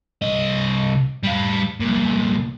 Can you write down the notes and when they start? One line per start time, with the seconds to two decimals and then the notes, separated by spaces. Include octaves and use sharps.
0.22 C2 D#5
1.23 G3 F5
1.81 C2 A#2